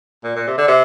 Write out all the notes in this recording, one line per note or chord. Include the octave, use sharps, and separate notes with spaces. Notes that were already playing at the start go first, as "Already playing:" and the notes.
A#2
A#2
C3
D3
C3